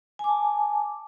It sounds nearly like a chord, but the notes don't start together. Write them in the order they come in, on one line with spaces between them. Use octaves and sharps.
G#5 D6 A5